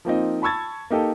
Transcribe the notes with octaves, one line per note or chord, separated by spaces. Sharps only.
F3 A#3 C4 D#4
A5 B5 C#6 E6 G#6 A6
A#3 D#4 G4 A4